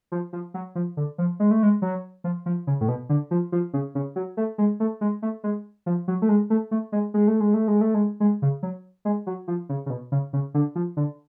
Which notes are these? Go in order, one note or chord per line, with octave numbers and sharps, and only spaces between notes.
F3
F3
F#3
F3
D3
F3
G#3
A3
G#3
F#3
F3
F3
C#3
A2
B2
D3
F3
F3
C#3
C#3
F#3
A3
G#3
A3
G#3
A3
G#3
F3
F#3
A3
G#3
A3
A3
G#3
G#3
A3
G#3
A3
G#3
A3
G#3
G#3
C#3
F#3
G#3
F#3
F3
C#3
C#3
B2
C#3
C#3
D3
F3
D3